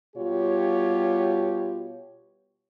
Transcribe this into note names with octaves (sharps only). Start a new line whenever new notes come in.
B2 G3 F4 G4 C#5